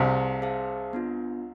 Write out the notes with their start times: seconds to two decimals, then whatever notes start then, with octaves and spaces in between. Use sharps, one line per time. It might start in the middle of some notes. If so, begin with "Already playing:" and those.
Already playing: C2 C3 G#4 C5 F5 A5
0.42 G#4 C5 F5 A5
0.93 B3 D4 F4